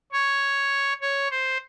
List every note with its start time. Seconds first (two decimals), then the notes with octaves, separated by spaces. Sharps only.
0.12 C#5
1.01 C#5
1.31 C5